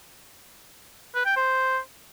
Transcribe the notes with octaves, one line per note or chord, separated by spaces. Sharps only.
B4
G5
C5